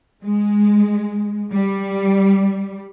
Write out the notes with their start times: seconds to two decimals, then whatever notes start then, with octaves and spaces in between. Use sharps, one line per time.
0.23 G#3
1.51 G3